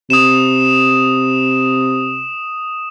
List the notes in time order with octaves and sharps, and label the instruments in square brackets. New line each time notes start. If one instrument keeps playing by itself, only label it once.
[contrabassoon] C3 [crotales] D#6 E7